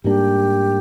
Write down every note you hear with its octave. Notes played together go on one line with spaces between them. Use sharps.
G#2 G3 A#3 D4 G4